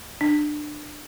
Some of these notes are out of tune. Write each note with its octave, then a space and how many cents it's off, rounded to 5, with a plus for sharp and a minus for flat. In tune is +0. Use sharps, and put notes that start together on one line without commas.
D4 +25